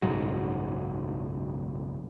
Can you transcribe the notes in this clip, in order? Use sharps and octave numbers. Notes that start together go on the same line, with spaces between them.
F#1 B1 G#2 F#3